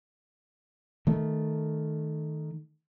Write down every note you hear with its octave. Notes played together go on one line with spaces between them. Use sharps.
D#3 A3